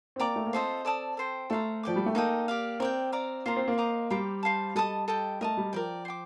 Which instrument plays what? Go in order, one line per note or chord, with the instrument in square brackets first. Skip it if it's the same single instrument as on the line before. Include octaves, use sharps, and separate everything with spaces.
[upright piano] C4
[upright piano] A#3 [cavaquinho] D5 G5 A#5 D6
[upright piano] A3
A#3
[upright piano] C4 [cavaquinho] F4 A4 C5 D#5
[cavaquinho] A4 D5 A5 D#6
A4 C5 G5
[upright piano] A3 [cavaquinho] A4 C5 F5 A#5
[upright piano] F3 [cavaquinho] D5 G5 D6
[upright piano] G3
A3
[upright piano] A#3 [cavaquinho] D#4 A4 D#5 G5
[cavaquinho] G4 D5 F5
[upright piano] C4 [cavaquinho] A#4 D5 G5
[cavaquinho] D5 F5 A#5
[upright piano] A#3 [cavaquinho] F4 C5 F5 A#5
[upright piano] C4
A#3
[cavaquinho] C5 D#5 A#5 D6
[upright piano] G3 [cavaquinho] C5 G5 A#5 D6
[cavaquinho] C5 F5 A5
[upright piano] G3 [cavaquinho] A4 D#5 A5 D#6
[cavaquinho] A4 D#5 G5
[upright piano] A3 [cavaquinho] A#4 D#5 A5
[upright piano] G3
[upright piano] F3 [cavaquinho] A#4 D5 G5
[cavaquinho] C5 G5 D6